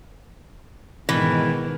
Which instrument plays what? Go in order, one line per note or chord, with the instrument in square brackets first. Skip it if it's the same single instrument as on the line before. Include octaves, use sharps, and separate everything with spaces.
[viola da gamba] G#2 B2 D#3 [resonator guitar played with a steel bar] E3